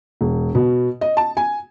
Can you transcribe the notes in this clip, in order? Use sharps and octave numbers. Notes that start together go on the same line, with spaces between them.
E1
B2
D#5
A5
G#5